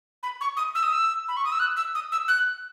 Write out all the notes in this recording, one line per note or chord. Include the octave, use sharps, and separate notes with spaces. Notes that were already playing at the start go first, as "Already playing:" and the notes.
B5
C#6
D#6
E6
D#6
E6
B5
C#6
D#6
E6
F#6
E6
D#6
E6
F#6